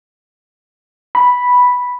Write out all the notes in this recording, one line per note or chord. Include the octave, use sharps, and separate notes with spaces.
B5